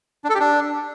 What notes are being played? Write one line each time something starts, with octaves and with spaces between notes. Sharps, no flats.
D4
A4
G4
D4